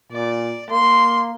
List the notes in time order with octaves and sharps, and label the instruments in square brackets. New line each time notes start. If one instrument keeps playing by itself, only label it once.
[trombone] A#2 [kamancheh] D5
[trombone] A#3 [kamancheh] C6